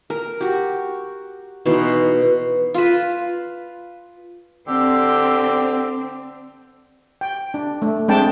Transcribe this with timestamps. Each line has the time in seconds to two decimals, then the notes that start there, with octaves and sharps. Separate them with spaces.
0.10 A#4
0.41 F#4 G4
1.66 B2 E3 D#4 C6
2.74 F4 B4
4.68 D3 C4 G4 E6
7.21 G5
7.54 D4
7.82 A3
8.08 G#3 A3 C4 D4 G5 A5